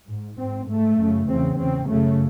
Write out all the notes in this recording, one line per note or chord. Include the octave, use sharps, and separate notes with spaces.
G#2
G#2 C4
G#2 A3
F#2 C#3
E2 C#3 C4
E2 C#3 C4
F#2 C#3 A3